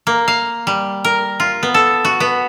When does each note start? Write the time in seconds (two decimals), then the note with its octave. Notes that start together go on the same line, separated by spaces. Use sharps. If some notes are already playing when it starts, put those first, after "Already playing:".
0.07 A#3
0.28 F5
0.67 G3
1.05 A#4
1.40 F4
1.63 B3
1.74 A4
2.05 F#4
2.20 B3